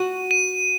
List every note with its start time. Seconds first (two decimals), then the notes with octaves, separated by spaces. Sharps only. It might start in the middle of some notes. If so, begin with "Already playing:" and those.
Already playing: F#4 D#7
0.31 D#7